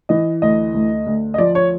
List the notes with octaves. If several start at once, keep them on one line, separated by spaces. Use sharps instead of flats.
E3 D#5
D2 D#5
D2
D2
D#5
F3 D5
C#5